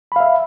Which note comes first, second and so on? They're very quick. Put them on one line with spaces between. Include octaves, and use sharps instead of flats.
B5 F5 E5